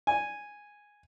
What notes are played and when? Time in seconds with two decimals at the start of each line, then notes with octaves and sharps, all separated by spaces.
0.07 G#5